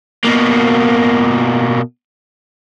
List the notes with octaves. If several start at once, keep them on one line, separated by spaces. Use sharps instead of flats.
B2 A#3